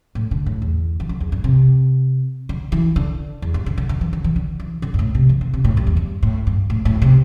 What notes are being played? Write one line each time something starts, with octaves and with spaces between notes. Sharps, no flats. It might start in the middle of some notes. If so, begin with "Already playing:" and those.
A2
D3
A2
E2
E3
D3
E2
G2
C3
D3
E3
D3
E2
G2
D3
D3
D3
E3
D3
E3
D3
E3
D3
G2
A2
C3
E3
D3
C3
A2
G2
E2
G2
A2
G2
A2
A2
C3